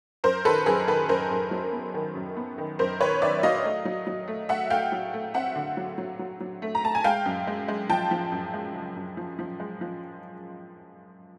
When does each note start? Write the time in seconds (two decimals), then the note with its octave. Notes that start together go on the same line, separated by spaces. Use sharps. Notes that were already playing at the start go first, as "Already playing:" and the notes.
0.24 F#2 A#4 C5
0.45 D#3 A4 B4
0.66 F#2 G#4 A#4
0.88 D#3 A4 B4
1.09 F#2 A#4 C5
1.31 F#2
1.51 F#3
1.73 B3
1.94 D#3
2.15 F#2
2.37 B3
2.58 D#3
2.79 F#2 A#4 C5
3.00 D#3 B4 C#5
3.22 D#3 D5 E5
3.43 F#3 D#5 F5
3.64 A3
3.85 F#3
4.07 F#3
4.28 A3
4.49 A3 E5 F#5
4.70 A3 F5 G5
4.92 F#3
5.13 A3
5.34 C4 E5 F#5
5.56 D3
5.77 F#3
5.98 F#3
6.19 F#3
6.40 F#3
6.62 A3
6.75 A#5
6.83 A3 A5
6.95 G#5
7.04 G#3 F5 G5
7.26 F#2
7.47 G#3
7.68 G#3
7.89 F3 G5 A5
8.11 F3
8.32 F#2
8.54 G#3
8.75 C#3
8.96 F#2
9.17 F3
9.39 F3
9.60 G#3
9.81 F3